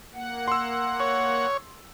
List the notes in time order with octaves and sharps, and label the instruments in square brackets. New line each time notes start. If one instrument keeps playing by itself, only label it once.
[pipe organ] A#3 F#5
[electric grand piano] C6 E6
[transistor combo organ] C#5